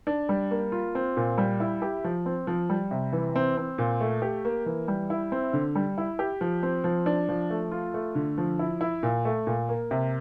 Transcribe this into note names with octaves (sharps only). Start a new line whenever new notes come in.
D4
G3
A#3
F4
C4
A#2
G3
E4
G4
F3
C4
F3
G3
C3
E3
C4
C4
A#2
A3
G4
A#3
E3
G3
E4
C4
D3
G3
E4
G4
F3
C4
F3
D4
F3
A3
F4
A3
D3
F3
E4
E4
A#2
A3
A#2
A#3
C3